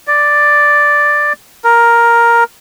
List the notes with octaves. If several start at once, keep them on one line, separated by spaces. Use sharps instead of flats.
D5
A#4